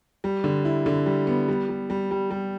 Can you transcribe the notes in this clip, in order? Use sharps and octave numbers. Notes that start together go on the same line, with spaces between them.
G3
D3
E4
D3
G3
B3
G3
G3
G3
G3
G3